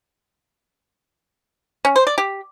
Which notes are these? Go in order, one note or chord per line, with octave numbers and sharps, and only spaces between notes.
C#4
C5
D5
G4